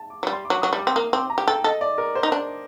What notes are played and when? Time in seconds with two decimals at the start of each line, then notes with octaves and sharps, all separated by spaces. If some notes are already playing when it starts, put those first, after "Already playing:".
Already playing: A5
0.10 D6
0.23 F#3
0.27 G3
0.33 C6
0.45 D6
0.50 F#3
0.62 F#3 D#6
0.73 G3
0.78 D6
0.87 C4
0.95 A#3 D#6
1.13 C4 D6
1.30 A#5
1.38 G4
1.47 A4 G5
1.64 A4 D#5
1.81 D5
1.98 A#4
2.15 C5
2.23 D#4
2.32 D4